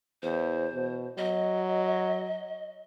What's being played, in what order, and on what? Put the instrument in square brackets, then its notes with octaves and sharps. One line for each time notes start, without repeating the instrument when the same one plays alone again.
[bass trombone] E2 [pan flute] C5
[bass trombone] B2
[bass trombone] F#3 [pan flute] D#5